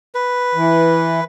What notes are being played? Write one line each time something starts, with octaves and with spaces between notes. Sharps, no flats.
B4
E3